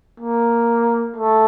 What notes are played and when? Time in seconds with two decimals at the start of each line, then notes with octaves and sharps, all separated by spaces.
0.20 A#3
1.16 A3